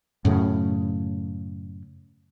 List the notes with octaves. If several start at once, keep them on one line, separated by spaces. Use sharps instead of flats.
F#2 A2 C#3